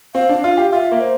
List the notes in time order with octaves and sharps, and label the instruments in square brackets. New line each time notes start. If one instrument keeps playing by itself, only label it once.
[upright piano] C4 [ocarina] F5
[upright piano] D4
F4
G4
[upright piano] F4 [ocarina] E5
[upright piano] A#3
[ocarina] C5